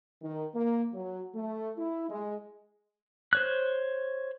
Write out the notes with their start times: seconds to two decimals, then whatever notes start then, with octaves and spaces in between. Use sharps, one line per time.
0.23 D#3
0.55 A#3
0.94 F#3
1.35 A3
1.77 E4
2.09 G#3
3.33 C5 C#5 F#6